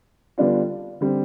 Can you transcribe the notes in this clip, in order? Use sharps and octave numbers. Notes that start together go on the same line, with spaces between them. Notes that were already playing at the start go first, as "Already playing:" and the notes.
D3 G3 B3 D4 F4
D3 G3 C4